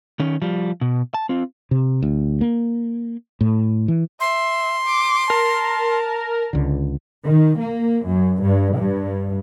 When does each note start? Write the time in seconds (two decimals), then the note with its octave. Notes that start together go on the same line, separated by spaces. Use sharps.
0.20 D#3 C#4
0.42 F3 G3
0.81 B2
1.14 A5
1.29 C4 F4
1.71 C3
2.02 D2
2.41 A#3
3.41 A2
3.88 E3
4.20 E5 C6
4.86 D6
5.30 A#4 A5
6.53 C#2 D3
7.26 D#3
7.59 A#3
8.08 F#2
8.43 G2
8.76 G2